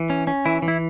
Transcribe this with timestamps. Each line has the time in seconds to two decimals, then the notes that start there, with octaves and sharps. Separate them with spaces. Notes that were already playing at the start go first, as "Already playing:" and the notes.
Already playing: E3
0.10 C#4
0.27 C#4
0.46 E3 E4
0.62 E3
0.68 E4